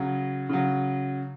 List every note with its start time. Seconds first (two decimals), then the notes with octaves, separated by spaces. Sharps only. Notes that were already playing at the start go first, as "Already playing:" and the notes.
Already playing: C#3 F#3
0.49 C#3 F#3